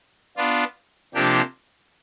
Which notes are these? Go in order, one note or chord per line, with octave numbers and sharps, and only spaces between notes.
B3 D4 F4
C3 F3 A#3 D4 G4